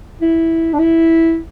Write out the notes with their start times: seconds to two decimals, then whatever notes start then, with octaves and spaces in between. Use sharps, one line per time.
0.21 E4
0.74 D4
0.79 E4